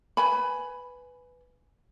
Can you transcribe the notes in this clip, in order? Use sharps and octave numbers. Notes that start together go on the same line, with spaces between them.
B4 G#5 B5